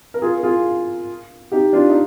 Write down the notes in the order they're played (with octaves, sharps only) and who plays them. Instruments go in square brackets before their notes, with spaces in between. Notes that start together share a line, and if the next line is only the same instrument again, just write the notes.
[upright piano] A#4
F4 G#4
A#4
F4 G#4
D#4 G4
D4 F4
D#4